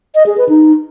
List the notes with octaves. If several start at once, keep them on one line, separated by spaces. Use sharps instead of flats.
D#5
G#4
B4
D#4